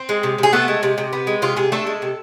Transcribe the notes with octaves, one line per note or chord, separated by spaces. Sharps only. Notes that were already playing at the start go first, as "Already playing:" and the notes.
Already playing: C4
G#3
C3
C3 G#4
A3 B3 A4
G#3
C3
C3
B3
G#3
C3 F4
C3 G#4
A3 D4 A4
G#3
C3